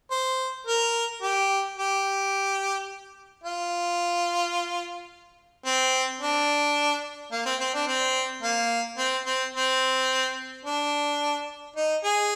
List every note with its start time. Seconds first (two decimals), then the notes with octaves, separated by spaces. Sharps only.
0.11 C5
0.67 A#4
1.22 G4
1.77 G4
3.44 F4
5.65 C4
6.21 D4
7.32 A#3
7.46 C4
7.60 C4
7.74 D4
7.88 C4
8.43 A#3
8.98 C4
9.26 C4
9.55 C4
10.65 D4
11.76 D#4
12.04 G#4